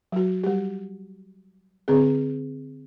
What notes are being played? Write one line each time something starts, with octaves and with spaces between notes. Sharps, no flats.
F#3 F#4
G3 G4
D3 C4 G#4